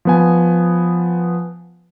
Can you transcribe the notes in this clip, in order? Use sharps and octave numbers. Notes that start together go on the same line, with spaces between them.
F3 B3 G#5